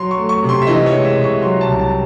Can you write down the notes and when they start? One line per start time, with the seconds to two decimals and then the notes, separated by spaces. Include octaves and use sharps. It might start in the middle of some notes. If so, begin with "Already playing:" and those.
Already playing: F#3 C6
0.11 C#6
0.17 A3
0.29 C#6
0.43 C3
0.49 C6
0.62 E5
0.67 E3 D#5
0.86 C#5
0.92 G#3
1.04 E5
1.17 C3
1.24 C#6
1.42 F#3 C6
1.61 A5
1.67 C2
1.79 A5